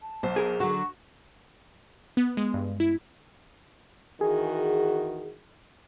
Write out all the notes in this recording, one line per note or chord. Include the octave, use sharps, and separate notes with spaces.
A5
B1 C5
G#4 A#4
D3 F#3 F#4 C#6
B3
G#3
G2
E4
D#3 E3 F#4 G#4